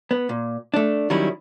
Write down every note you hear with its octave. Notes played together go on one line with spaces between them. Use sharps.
B3
A#2
A3 D4
D#3 F#3 G3 C#4 E4